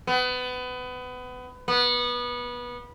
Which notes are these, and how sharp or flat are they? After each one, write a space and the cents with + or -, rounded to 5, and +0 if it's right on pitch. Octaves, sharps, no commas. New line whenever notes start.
B3 +25
B3 -20